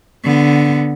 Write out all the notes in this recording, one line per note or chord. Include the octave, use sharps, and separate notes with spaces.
D3 B3